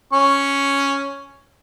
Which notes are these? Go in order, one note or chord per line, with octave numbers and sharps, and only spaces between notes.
C#4 C#6